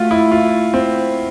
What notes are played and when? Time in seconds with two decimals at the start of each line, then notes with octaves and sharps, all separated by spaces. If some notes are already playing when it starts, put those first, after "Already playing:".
Already playing: A3 F4 F#4
0.11 E4
0.32 F4
0.74 C4